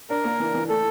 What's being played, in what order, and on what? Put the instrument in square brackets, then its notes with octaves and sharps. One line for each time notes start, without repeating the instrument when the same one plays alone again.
[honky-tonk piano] D4 [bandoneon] A#4
[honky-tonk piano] A#3
E3
E3
[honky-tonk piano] A3 [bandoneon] A4